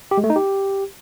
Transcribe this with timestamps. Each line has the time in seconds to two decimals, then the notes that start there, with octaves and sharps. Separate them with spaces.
0.11 G4
0.18 G#3
0.24 A3
0.30 D#4
0.36 G4